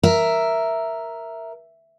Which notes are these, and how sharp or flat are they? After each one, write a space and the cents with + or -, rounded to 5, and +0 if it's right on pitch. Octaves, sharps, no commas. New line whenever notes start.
A#4 +0 E5 +0